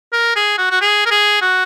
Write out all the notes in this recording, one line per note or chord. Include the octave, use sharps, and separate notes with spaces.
A#4
G#4
F#4
F#4
G#4
A#4
G#4
F#4